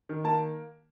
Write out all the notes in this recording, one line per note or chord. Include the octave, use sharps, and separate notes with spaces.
D#3
A#3 A5